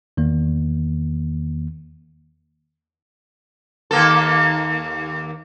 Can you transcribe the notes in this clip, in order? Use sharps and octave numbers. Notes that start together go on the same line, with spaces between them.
E2 D#3 A#3
D#2 A#3 A4